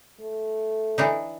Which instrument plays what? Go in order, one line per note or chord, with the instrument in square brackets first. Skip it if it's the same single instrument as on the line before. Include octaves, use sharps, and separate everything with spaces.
[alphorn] A3
[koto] E3 D4 D#4